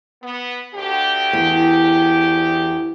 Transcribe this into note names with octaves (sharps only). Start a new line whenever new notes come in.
B3
D2 G4
E2